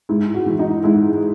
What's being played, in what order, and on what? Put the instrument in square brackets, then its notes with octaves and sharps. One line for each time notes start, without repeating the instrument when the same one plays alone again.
[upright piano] G#2 E4
F#4
E3
D#4
G#2 E4